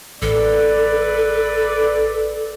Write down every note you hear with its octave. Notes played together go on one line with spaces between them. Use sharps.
A1 A4 B4 D5